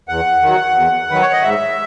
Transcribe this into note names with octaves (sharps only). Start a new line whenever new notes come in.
E2 F#5
D#3 F#3
E2
D#3 F#3 B4
C#5
D#5
G#2 E5